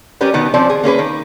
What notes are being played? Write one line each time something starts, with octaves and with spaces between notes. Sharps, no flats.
G3 C#4 G4 A#4 B4
B2 D#3 B3
F3 C4 C#4 D5
G#4
A#3 C#4 G#4 B4
D#3